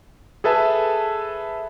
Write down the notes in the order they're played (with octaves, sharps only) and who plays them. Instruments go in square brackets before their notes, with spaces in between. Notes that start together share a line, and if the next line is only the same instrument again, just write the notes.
[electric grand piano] G#4 A4 B4 E5 A5